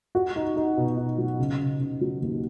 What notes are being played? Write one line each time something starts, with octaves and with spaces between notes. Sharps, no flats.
F#4
D#4
D#4
B2
D#4
F#3
C#3
C#3
C#3
F#3
D#2